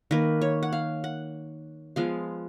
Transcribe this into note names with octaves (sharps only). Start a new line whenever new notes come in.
D#3 A#3 B4
C#5
F#5
F5
F#5
F3 G#3 B3 F5